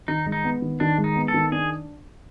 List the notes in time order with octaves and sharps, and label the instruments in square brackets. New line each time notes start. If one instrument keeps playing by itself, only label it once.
[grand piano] D#3 [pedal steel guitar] D#4
[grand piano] G#3
[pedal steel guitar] D#4
[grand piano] B3
D#3
[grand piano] D#3 [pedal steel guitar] D4
[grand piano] G#3
[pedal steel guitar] D#4
[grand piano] B3
[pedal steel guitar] A4
[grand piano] D#3
[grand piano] D4 [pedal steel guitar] G#4